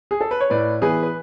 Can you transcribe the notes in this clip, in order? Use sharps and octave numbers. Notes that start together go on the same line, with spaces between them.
G#4
A4
B4
C#5
A2 B4 D5
E3 B3 G#4 B4
B4